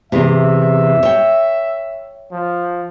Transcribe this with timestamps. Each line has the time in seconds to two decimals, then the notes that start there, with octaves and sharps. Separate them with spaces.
0.12 E2 C3 E5
1.03 C#5 G5
2.32 F3